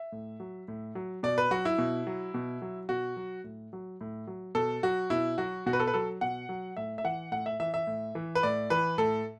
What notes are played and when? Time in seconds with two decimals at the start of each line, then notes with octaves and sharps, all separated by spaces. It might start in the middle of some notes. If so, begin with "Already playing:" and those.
Already playing: E5
0.12 A2
0.40 F#3
0.68 A2
0.95 F#3
1.23 B2 D5
1.38 B4
1.51 F#3 F#4
1.65 E4
1.78 B2
2.07 F#3
2.34 B2
2.62 F#3
2.89 B2 F#4
3.16 F#3
3.44 A2
3.73 F#3
4.01 A2
4.27 F#3
4.55 B2 A4
4.83 F#3 F#4
5.10 B2 E4
5.38 F#3 F#4
5.66 B2 F#4
5.73 B4
5.80 A4
5.87 B4
5.94 F#3 A4
6.21 B2 F#5
6.49 F#3
6.77 A2 E5
6.98 E5
7.04 E3 F#5
7.32 A2 F#5
7.46 E5
7.60 E3 E5
7.74 E5
7.87 A2
8.15 E3
8.35 B4
8.43 A2 D5
8.70 E3 B4
8.98 A2 A4